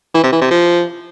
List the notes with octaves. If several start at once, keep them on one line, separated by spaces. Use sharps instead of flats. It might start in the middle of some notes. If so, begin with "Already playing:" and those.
E3
C3
E3
C3
F3